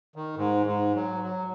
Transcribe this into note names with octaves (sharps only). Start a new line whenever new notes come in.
D#3
G#2
G#2
F#3
F#3